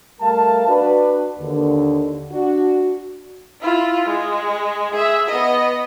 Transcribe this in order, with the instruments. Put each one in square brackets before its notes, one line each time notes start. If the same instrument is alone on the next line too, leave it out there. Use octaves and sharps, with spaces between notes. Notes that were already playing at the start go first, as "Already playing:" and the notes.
[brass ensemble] G3 A3 A#4 F5 A5
D4 F#4 B4
D#2 D3
D4 F#4
[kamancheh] E4 F4
G#3
G#4 E5
B3 D#5